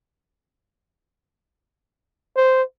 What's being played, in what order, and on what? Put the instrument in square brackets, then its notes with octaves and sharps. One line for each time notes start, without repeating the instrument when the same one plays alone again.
[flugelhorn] C5